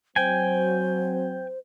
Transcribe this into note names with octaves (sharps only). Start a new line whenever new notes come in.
F#3 C4 C5 G5 G#5